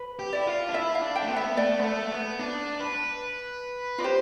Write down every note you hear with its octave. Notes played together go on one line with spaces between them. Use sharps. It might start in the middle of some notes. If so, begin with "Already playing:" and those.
Already playing: B4
G4
E4 D5
F4
D4
E4 E5
F5
D4
G5
A3
B3
E5
A3 D5
B3
A3
B3
D4
B4
F4 D5
G4 C5